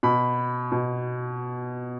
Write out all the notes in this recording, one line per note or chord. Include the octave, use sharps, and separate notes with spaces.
B2 B5
B2